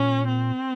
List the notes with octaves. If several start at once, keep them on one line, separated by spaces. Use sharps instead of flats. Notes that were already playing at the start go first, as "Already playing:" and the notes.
Already playing: A#2 C#4
C4